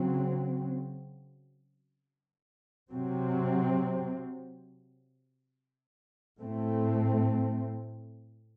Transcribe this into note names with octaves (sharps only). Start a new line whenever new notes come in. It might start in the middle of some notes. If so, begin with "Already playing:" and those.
Already playing: C#3 F#3 C4
C3 F#3 C4
A2 A3 C4